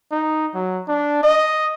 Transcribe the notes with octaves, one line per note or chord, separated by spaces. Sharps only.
D#4
F#3
D4
D#5